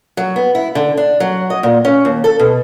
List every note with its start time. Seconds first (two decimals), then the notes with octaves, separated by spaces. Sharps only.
0.17 F#3
0.36 B3
0.55 E4
0.75 D3
0.97 D4
1.20 F#3
1.50 D#5
1.63 A#2
1.85 C#4
2.05 D#2
2.24 A4
2.39 B2